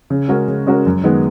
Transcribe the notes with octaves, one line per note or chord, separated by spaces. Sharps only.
C#3
G#3 C#4 F#4 A#4
C#3
G#3 C#4 F#4 A#4
F#2
D#3 G#3 B3